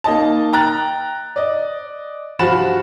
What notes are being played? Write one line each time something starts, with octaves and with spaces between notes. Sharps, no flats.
A#3 D#4 D#5 A5
G5 A#5 F#6 A6
D5 D#5
G2 F3 F#4 B5 A6 E7